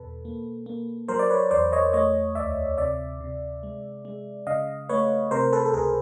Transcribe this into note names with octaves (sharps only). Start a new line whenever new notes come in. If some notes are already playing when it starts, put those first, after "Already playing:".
Already playing: E2 B2 A4 B4
A#3
A#3
F#3 A#4 C5
D5
B4 C#5
E2 C5 D5
C#5 D#5
A3 C#5 D#5
D2 D5 E5
C3 D5 E5
C3
G#3
G#3
C#3 D#5 F5
A3 B4 C#5
C3 A#4 C5
A4 B4
A4
C#2 G#4 A#4